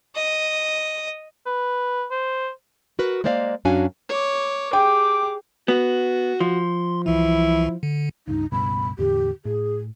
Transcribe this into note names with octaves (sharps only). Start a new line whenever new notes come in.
D#5
B4
C5
F#4 A#4 B4
G#3 A#3 C5 D5 E5 F5
F#2 C#4 D4 F#4 F5 G#5
C#5 D6
G4 G#4 G5 D6
B3 F#4
F3 C6
C2 E3 E4
D3
C#2 G2 D#4
C#2 G2 B2 B5
E2 A2 D3 G4
A2 G#4